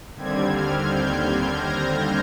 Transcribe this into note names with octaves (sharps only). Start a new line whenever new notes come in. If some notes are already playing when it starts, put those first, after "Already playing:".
D#2 D3 G3 C4 G#6
F6
G6
G#6
A#6